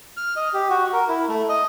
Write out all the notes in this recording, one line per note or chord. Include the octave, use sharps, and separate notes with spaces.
F6
D#5
G4
F#4
A#4
E4
A3
D#5